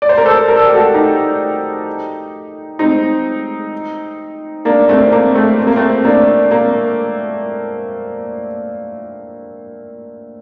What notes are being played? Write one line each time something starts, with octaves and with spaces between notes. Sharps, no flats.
D5
C5
A#4
A4 C5
A#4
A4
G4
F#4 A4
D#4 G4
C4 D#4
A#3 D4
A3 C4
A#3
A3 C4
C4
A#3
A3 C4
A#3 D4
A#3